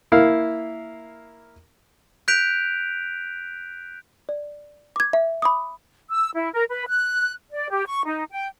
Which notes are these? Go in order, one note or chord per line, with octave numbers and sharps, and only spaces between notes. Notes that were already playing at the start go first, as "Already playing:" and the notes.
A#3 E4 F5
F#6 G6 B6 D7 F7
D5
D6 G#6
E5
B5 D6 D#6
E6
E4
A#4
B4
F#6
D5
G4
C#6
D#4
G5